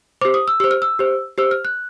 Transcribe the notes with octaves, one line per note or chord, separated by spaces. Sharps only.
G4 C5 D6
D#6
E6
G4 C5 E6
F6
E6
G4 C5
G4 C5 E6
F6
F#6